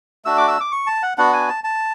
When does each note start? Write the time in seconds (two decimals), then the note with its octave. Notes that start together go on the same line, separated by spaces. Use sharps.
0.25 A3 D4 F#4 E6
0.37 D6
0.48 E6
0.60 D6
0.72 C#6
0.86 A5
1.02 F#5
1.18 B3 D4 F#4 F#5
1.33 G#5
1.49 A5
1.64 A5